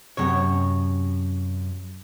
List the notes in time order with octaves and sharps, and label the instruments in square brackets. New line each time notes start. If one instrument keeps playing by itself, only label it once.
[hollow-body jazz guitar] F#2 C3 C#5